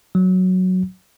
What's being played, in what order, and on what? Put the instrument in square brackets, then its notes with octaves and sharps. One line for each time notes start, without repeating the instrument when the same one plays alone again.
[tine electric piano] F#3